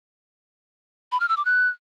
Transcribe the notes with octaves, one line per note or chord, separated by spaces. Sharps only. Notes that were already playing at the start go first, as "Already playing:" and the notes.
B5
F6
E6
D6
F#6